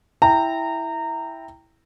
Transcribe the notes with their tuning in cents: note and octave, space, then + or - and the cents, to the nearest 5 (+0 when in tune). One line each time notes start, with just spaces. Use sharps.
E4 +0 G5 +0 A#5 -20